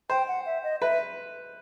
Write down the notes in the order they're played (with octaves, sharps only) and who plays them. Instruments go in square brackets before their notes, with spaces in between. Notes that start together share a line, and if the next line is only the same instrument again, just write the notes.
[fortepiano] C5 [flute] G5
[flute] F#5
E5
D#5
[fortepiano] B4 [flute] E5